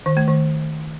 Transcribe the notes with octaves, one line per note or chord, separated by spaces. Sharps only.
D#3
A3
D#3